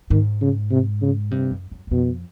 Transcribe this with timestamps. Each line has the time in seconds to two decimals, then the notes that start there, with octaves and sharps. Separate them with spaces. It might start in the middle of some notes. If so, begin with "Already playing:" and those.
0.10 G#2 D#3
0.41 C#3
0.71 C3
1.01 C#3
1.31 G2 C3
1.51 F#2
1.71 F#2
1.87 F#2
1.91 F2 B2